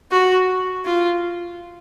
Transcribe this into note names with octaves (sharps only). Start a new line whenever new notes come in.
F#4
F4